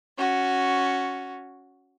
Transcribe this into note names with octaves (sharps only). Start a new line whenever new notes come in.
C#4 F#4